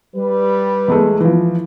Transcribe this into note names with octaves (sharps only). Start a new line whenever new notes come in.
G3 B4
E2 G#3 A3
E3 F3